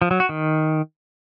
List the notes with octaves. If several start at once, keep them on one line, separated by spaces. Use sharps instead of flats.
F3
F#3
F#4
D#3